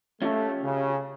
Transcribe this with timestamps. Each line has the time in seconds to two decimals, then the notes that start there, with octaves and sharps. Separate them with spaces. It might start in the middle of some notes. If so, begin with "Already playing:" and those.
0.22 A3 C#4 F4 G4
0.63 C#3